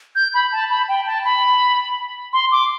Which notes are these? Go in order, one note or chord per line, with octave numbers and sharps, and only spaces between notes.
G6
B5
A5
B5
G5
A5
B5
C6
D6